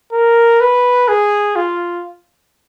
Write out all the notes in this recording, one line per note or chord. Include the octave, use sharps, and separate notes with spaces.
A#4
B4
G#4
F4